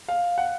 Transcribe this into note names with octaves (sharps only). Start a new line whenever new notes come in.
F5
F#5